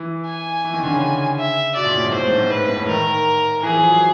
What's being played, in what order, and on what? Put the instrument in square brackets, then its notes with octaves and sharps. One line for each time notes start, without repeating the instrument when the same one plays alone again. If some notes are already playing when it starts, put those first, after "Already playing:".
Already playing: [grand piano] E3
[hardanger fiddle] G#5
[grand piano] E3
D#3
D3
C#3
[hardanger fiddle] E5
[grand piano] B2 [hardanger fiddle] D5
[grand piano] A#2
A2
G#2
[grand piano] A2 [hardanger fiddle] C5
[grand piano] G#2
G#2
[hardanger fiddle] B4
[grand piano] G#2
A2
[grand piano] D#3 [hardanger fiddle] A#4
[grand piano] E3 [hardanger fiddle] G#4
[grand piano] F3
F#3